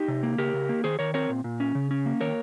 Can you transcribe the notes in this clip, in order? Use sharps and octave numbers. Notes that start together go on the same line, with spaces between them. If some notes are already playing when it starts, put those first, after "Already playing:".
Already playing: D#4 G4
C3
A#3
C#3 G4 A#4
C#3
A#3
D#3 G#4 C5
D#3 A#4 C#5
C4 A#4 C#5
A#2
A#2
C#4
C#3
C#4
A#3
D#3 A#4 C#5